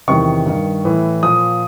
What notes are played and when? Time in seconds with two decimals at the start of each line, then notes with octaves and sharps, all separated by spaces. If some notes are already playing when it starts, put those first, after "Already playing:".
0.08 E2 C3 D#3 C#6
0.46 G2 D#3
0.85 A2 E3
1.23 A#2 F3 D#6